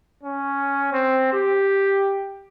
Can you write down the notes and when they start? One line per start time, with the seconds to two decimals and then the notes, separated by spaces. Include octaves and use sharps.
0.23 C#4
0.93 C4
1.33 G4